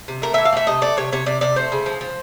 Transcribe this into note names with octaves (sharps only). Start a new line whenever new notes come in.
C3
A3 A#4
E3 E5
F5
A3 E5
C3 D#5
A3 D5
C3 C#5
C3 C#5
C3 D5
C3 D5
A3 C5
C#3
F3
F3